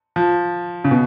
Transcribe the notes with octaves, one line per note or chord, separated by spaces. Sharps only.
F3
C#3
B2